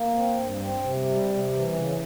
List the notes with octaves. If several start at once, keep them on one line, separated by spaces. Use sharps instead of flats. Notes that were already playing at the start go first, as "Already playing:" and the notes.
Already playing: A#3
C4
G2
C4
C3
G3
C3
E3
C#3